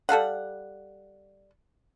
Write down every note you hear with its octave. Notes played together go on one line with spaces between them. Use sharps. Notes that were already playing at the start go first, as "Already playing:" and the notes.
G3 A4 F5 F#5